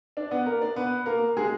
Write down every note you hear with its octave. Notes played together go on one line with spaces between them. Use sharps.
D4 D5
B3 B4
A#3 A#4
D4 D5
B3 B4
A#3 A#4
G#3 G#4